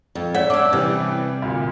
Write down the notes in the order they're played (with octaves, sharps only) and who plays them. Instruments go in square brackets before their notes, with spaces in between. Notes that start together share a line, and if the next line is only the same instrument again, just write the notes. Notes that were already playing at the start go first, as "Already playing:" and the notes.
[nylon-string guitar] F2
[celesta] C#5 D5 F#5 [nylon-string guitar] E5
[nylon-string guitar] C#4 D4 [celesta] D6 E6
[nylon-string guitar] C3 [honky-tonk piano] E3 G3
[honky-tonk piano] D2 A#2